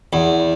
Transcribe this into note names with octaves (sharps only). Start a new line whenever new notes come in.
E2